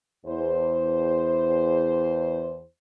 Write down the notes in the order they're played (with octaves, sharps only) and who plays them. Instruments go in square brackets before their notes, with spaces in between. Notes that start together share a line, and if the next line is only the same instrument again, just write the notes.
[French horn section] E2 C5